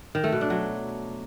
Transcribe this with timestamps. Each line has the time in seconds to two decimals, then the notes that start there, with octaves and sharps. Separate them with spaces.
0.15 D#3
0.24 A3
0.32 B2
0.41 D4
0.50 F#3